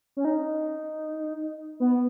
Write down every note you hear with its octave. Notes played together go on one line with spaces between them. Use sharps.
C#4
D#4
B3